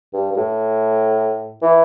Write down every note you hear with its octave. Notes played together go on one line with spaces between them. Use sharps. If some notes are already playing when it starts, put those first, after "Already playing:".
G2
G2
A2
E3